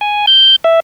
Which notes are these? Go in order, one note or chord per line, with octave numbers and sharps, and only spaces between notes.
G#5
G6
E5